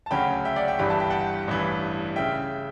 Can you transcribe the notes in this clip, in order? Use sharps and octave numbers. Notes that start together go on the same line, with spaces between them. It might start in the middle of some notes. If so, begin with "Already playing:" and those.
A5
D2 C#3 F#3 C#4 G5 B5
E5 G5
D5 F#5
E5 G5
G1 G2 E3 G3 B5
A5
G5
F#5 A5
A1 G2 E3
C#3 E5 G5